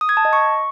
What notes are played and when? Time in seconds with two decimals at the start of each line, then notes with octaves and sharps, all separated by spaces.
0.01 D#6
0.09 G#6
0.17 A5
0.25 D#5
0.33 C#6